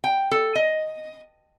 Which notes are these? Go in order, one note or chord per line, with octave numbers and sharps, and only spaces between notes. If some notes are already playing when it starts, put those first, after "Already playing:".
G5
A4
D#5